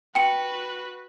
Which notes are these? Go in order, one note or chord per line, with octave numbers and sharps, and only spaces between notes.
F#4 B4 G5 C#7